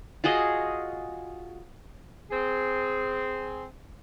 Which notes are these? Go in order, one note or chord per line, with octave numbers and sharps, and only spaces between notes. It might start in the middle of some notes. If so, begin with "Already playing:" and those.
F4 F#4 G#4 D#5
C4 G#4